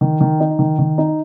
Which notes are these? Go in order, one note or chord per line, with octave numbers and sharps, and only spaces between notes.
D#3
D#3
D#4
D#3
D#3
D#4